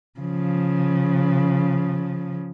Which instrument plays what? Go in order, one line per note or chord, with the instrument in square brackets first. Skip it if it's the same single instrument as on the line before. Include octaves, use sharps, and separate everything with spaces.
[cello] C#3 F3